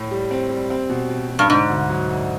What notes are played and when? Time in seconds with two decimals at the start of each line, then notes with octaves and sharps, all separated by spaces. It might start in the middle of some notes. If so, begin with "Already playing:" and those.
Already playing: A2
0.11 G3
0.31 C4
0.50 G3
0.70 C4
0.90 B2
1.10 B2
1.29 B2
1.39 G2
1.50 G#2 D3
1.70 D2
1.89 F#3
2.09 D3